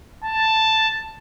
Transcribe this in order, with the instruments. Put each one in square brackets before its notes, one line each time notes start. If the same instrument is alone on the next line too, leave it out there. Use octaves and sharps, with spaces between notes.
[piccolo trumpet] A5